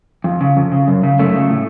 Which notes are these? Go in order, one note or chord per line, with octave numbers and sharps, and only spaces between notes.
F2
C#3
F2
C#3
F#2
C#3
F#2 A3
C#3
A2